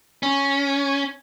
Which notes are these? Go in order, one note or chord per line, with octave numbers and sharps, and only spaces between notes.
C#4